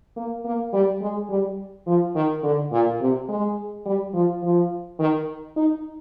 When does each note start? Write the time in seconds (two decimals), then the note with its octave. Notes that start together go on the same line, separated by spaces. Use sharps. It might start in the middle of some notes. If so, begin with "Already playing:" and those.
0.16 A#3
0.44 A#3
0.73 G3
1.01 G#3
1.30 G3
1.86 F3
2.15 D#3
2.43 D3
2.72 A#2
3.00 C3
3.28 G#3
3.86 G3
4.14 F3
4.42 F3
4.99 D#3
5.56 D#4